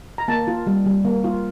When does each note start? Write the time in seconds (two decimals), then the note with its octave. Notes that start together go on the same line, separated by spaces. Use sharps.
0.18 A#5
0.28 A#3 A5
0.48 F4
0.67 G3
0.86 G3
1.05 A#3
1.24 F4